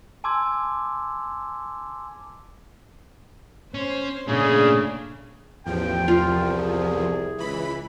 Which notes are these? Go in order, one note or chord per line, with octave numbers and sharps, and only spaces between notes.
G#5 A5 C6 D6 E6 G#6
C#4 C5
A#2 C#3 A3 D4 G#4
A1 E2 F3 G5
C2 F4
G#4
C#2 E3 B5